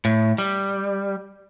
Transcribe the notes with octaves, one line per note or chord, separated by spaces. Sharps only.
A2
G3